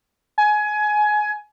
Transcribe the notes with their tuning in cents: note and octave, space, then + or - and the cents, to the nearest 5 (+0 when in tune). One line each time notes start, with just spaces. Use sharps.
G#5 +20